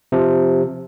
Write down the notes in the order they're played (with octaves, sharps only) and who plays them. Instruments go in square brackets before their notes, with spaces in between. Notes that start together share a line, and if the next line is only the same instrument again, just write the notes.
[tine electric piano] C3 F3